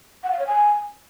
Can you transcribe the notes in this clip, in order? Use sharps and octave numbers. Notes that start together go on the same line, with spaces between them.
F#5
F5
C#5
G#5